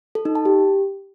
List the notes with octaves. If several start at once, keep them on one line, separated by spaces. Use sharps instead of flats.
A4
D#4
A5
G4